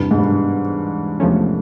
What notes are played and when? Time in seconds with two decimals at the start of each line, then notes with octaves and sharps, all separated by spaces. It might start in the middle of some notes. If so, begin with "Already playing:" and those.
Already playing: E2 G2 C3 E3
0.11 G#2
0.19 G2
1.20 E2 C3 F3 A3 C#4